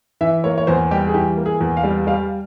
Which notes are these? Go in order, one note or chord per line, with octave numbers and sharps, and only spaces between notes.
E3 E5
A#3 C#5
C#5
E2 C5
G3 G4
G#4
E3 G4
A#3
G#4
E2
F5
G3
G3 F5